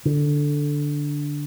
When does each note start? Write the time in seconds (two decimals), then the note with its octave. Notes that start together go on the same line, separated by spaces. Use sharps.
0.05 D3